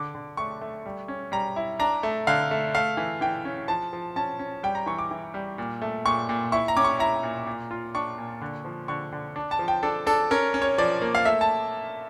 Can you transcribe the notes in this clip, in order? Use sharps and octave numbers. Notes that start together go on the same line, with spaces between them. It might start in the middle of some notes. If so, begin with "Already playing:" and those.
Already playing: D3 D6
D3
A3 C#6
A3
G3
C#4
G3 A#5
E4
D4 A#5
A3
D3 F5
A3
A3 F5
E3
E3 G5
C#4
F3 A5
F3
C#4 A5
C#4
G3 G5
A#5
E3 C#6
D6
E3
G3
A#2
A3
A#2 C#6
A#2
E4 C#6
A#5
C#4 D6
C#6
E4 A#5
A#2
A#2
F4
D4 C#6
A#2
D3
F3
D3 C#6
D3
D4
A5
F3
G5
D4 A4
D4 A4
C#4 A#4
C#4
C#5
F3 D5
A#3
F5
A3 E5
A5